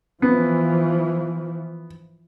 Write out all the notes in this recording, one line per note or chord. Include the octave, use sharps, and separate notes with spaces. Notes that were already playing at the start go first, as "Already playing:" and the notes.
E3 F3 B3